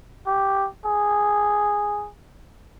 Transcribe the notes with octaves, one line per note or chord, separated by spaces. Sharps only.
G4
G#4